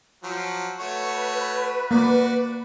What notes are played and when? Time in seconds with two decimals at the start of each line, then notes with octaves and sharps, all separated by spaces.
0.23 F3 F#3
0.80 A3 F#4 B4 C#5
1.91 A#3 F#4 D5